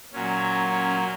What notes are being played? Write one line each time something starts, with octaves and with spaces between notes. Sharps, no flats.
A#2 F#3 C#4
C#4